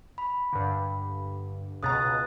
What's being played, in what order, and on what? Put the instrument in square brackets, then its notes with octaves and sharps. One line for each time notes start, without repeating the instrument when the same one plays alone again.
[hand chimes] B5
[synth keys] G2 D3
[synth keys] C#2 B2 A#5 [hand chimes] D#6 F#6 A6